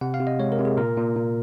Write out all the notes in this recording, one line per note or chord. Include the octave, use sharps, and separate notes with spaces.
C3 F#5
F5
C3
D#5
G#3 C#5
A#4
C3
G#4
A#2 A#4
A#2
A#2